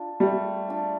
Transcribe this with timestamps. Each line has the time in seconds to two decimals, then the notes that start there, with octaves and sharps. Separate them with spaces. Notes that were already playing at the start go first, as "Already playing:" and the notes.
Already playing: D4 F4
0.20 G3 A3
0.68 D4 F4